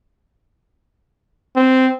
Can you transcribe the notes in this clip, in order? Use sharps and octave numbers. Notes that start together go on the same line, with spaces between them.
C4